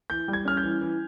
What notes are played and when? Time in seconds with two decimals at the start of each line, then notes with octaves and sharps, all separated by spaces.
0.10 E3 G6
0.28 G3
0.33 G#6
0.45 C#4 F6
0.57 G6
0.64 E3
0.81 E3